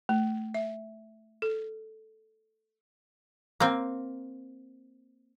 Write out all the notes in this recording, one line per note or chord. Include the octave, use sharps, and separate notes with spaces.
A3
E5
A4
A#3 C4